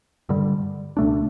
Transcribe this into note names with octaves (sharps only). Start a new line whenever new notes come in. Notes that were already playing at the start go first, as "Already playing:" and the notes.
G2 D3 G3
C#2 B2 A3 D4